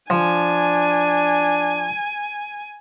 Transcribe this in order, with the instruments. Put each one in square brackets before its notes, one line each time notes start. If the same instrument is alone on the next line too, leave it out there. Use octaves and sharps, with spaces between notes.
[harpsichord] F3 [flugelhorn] D4 [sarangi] G#5